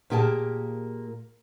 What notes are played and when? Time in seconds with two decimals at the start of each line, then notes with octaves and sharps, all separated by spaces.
0.10 A#2 A#3 G4 G#4 G5 A5